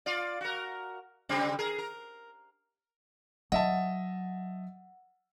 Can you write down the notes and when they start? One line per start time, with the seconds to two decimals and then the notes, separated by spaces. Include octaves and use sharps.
0.06 F4 D5
0.41 F#4 A#4
1.29 C#3 G3 C4
1.59 G#4 A#4
1.78 A#4
3.52 F#3 D#5 E5 F#5 A5